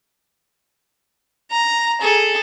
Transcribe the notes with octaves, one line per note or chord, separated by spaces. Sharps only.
A#5
G#4 A4